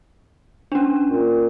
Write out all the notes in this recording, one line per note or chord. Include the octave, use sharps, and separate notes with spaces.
C#4 D4
A#2